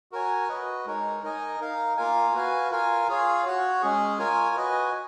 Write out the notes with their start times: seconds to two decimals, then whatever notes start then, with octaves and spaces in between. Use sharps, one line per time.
0.12 F#4 A#4 C#5 G#5
0.49 F#4 B4 D#5
0.86 G#3 D#4 A#4 C#5
1.23 D#4 A#4 D#5 G#5
1.60 D#4 A#4 F5
1.97 A#3 F4 A#4 F5 G#5
2.34 F#4 B4 F5 G#5
2.71 F4 A#4 F5 G#5
3.08 F4 G#4 C#5 F5
3.45 F#4 C#5 F#5
3.82 G#3 C#4 G#4
4.18 F4 A#4 C#5 G#5
4.56 F#4 B4 D#5 G#5